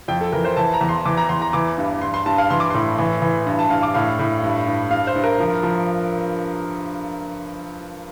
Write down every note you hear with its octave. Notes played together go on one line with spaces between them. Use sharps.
F2 G5
A4
E3 A#4
C5
E3 A5
A#5
E2
C6
E3 D6
A#5
E2 C6
A#5
E3 D6
G2
G2 C6
C6
G2 A5
F5
E3 C6
D6
A2 C6
E3
E3
G2
A5
G2 F5
D6
A2 F5
A2
G2
G2
G2 F5
C5
G2
A#4
F3
F3